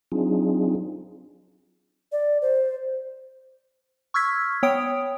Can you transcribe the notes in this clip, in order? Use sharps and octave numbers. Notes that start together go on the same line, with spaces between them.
F#3 C4 D4 D#4 F4 G#4
D5
C5
C#6 E6 F6 G#6 B6
B3 C#5 G5 D#6 D7